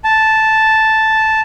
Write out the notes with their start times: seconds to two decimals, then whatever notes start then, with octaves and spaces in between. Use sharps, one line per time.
0.04 A5